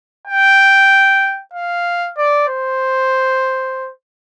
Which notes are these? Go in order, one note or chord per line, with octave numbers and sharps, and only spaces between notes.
G5
F5
D5
C5